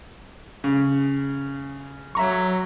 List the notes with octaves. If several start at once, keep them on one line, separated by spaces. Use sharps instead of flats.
C#3
F#3 E5 A#5 C#6